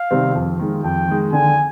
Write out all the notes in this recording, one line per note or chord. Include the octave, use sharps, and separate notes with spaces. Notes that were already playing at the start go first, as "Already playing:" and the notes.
Already playing: F5
C3 D#3 G3 C4
F2
D#3 G#3
F2 G5
D#3 G#3
D3 G#5